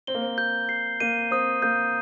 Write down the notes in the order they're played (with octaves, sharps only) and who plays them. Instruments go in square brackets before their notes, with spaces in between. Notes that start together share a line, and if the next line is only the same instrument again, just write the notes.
[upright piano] C4 [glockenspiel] G7
[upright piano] A#3
C4
[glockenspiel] G6
C7
[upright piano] A#3 [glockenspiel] D#7
[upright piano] C4 [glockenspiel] D#6
[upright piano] A#3 [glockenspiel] G6